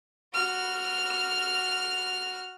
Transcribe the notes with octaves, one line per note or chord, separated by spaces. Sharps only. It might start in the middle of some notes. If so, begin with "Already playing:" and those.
F#4 F6